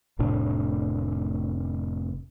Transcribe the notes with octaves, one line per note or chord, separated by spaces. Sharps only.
F1 A2 C3 D4